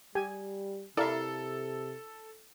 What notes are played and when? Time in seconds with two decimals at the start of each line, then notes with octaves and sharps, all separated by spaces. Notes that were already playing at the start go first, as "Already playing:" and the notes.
0.15 G3 G4 G#5
0.97 C3 E4 A4 A#4 D5 E5 F5